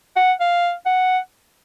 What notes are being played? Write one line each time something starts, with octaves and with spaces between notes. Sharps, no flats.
F#5
F5
F#5